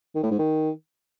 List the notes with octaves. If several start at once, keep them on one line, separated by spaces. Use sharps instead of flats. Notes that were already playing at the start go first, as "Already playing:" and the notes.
D#3
A2
G#2
D#3